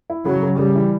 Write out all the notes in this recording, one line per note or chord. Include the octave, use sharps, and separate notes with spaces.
E4
C#3 F#3
C#3
C#3 G3
E3